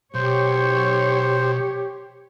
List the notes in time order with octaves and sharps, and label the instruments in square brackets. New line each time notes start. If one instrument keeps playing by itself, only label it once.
[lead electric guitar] B1 [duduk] G4 [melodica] C5 [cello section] C#5